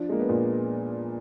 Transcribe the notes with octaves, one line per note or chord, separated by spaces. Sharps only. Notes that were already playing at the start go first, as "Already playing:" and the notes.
Already playing: F3 D4
G#3 A#3
B3
A#2